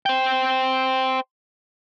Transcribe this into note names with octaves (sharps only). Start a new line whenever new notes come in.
C5 G5